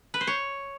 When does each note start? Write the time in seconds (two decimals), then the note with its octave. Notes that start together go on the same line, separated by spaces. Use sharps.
0.14 B4
0.21 C5
0.27 C#5